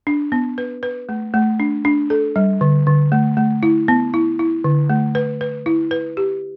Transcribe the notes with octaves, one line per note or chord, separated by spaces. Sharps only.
D4
B3
B4
B4
A3
A3
D4
D4
A4
G3
D3
D3
A3
A3
E4
B3
E4
E4
D3
A3
B4
B4
E4
B4
G4